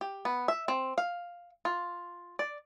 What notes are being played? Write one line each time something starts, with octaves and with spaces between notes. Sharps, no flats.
G4
B3
E5
C4
F5
F4
D5